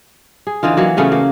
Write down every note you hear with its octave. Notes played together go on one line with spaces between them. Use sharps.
G#4
D3 E3 D#4 F4
E3 F#3 A#3
C#3 A3 B3 C#4
A#3